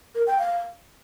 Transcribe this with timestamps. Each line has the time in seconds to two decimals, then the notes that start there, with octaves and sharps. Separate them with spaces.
0.15 A#4
0.27 G5
0.39 F5